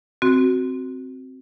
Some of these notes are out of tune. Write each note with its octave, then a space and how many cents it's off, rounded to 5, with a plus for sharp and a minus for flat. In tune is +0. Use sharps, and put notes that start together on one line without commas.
C4 +0 F#4 +0